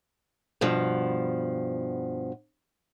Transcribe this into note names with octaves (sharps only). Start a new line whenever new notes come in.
G2 B2 F3